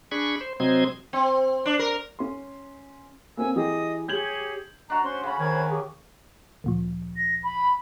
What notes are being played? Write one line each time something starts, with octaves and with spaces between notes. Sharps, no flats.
D4 G#4 B5 C#6
C5
C3 F#3 C4 C5 D#5 G#6
C4
D4
A#4
C#4 C6
A#3 C4 C#4 G#5 E6
E3 G4 G#4 D#5 D#6
G4 G#4 C#5 G6 G#6 F#7
D4 F#4 D#5 A#5
C#4 C5 C6
C#3 C#4 F#5 B5
D#3 C#4 C5 B5 G#6
G4 G#4
D2 A#2 F3
A#6
B5